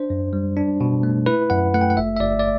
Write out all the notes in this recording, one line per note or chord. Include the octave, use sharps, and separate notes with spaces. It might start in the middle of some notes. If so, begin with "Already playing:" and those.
Already playing: D4 C5
F#2
G3
D4
B2
A3
E4 B4
F#2 F#5
A3 F#5
G5
F#5
G1 E5
E5
G1 D5
D5